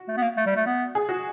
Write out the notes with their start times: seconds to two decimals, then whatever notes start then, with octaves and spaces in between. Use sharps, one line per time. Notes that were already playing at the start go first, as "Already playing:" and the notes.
Already playing: F#4
0.08 A3
0.17 B3
0.22 A#3
0.37 A3
0.46 G3
0.56 A3
0.66 B3
0.95 G#4
1.09 F#4